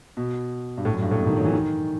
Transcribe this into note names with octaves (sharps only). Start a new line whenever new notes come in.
B2
G2
A2
F#2
G2
A2
B2
D#3
F#3
E3
D#3